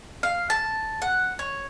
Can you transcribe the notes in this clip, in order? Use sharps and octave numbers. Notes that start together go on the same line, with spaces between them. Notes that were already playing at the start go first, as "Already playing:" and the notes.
F5
A5
F#5
C#5